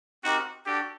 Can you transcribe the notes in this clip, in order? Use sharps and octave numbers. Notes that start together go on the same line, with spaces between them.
C4 D#4 F#4 G4 A#4
D4 F#4 G4 A4 D5